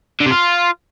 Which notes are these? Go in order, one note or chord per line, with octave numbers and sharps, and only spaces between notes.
D3
C3
F4